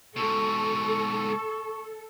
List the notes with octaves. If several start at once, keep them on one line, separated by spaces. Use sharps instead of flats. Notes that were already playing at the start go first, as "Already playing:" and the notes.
G#2 B2 A4 C#6